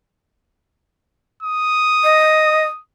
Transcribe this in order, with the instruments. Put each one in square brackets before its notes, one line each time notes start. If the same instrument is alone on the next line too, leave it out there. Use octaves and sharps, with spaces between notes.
[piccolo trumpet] D#6
[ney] D#5